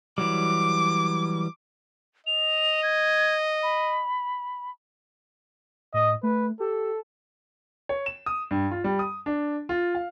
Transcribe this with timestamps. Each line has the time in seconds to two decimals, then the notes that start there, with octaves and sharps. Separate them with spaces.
0.18 E3 F#3 G3 D6
2.27 D#5 F7
2.83 G#6
3.63 B5
5.94 A2 D#5
6.23 A3 B4
6.60 G4 A4
7.89 C#5
8.06 E7
8.26 D#6
8.51 G2
8.71 F4
8.84 G3
8.99 D#6
9.26 D4
9.69 F4
9.95 F5